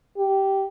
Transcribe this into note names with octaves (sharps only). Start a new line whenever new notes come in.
G4